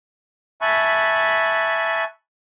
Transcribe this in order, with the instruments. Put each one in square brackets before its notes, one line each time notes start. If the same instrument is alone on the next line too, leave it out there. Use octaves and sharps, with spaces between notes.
[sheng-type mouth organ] E5 G#5 A5 B5 C#6 F#6